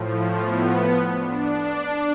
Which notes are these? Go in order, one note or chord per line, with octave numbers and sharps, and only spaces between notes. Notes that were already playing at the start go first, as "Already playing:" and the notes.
Already playing: A2 F3
B3
D4